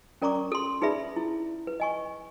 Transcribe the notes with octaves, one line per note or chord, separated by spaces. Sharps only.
C#4 A#4 D5 A#5 C#6 D6
A4 C6
D#4 G#4 B4 D5 E5 B5
E4
B4
D#5 G#5 C#6